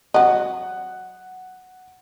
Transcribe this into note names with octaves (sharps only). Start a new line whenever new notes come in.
F#3 D#5 F#5